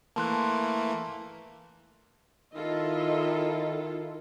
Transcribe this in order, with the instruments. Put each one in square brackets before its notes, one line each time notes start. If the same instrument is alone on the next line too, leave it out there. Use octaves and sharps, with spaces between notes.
[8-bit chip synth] E3 A3 A#3 [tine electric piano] A5 C6 F#6
[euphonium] D#3 [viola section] E4 F4 A4 [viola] D#5 E5